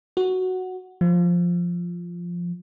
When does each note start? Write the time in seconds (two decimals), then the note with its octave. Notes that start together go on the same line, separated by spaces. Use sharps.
0.17 F#4
1.01 F3